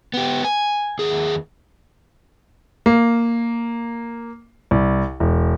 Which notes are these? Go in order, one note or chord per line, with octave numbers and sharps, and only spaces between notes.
B3 G4
G#5
D#2 G#4
A#3
C2
E1